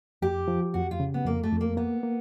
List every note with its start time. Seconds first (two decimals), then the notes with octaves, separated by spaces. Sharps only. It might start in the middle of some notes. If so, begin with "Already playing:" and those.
0.22 F2 G4
0.48 F3
0.74 F2 F#4
0.91 F4
1.00 C#3
1.14 B3
1.26 F2 A#3
1.43 A3
1.52 F2
1.61 A#3
1.77 A#3 B3
2.03 A#3